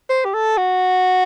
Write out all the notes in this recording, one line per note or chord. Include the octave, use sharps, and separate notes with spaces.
C5
G4
A4
F#4